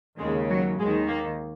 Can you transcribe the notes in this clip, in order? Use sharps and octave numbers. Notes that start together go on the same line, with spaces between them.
D#2 C#3 G#3
F#3
D#2 D#3 G#3
A#3